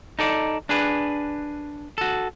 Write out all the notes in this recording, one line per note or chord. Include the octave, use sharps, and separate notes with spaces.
D#4 A4 D5
D4 G#4 B4
F#4 A4